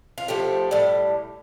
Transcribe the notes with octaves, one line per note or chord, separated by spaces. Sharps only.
F4
A2 F3 A3 G4
A2 G3